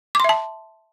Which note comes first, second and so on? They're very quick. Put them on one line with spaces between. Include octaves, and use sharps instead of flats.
D6 C6 E5 A5